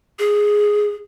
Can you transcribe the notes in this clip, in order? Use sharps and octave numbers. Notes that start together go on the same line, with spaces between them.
G#4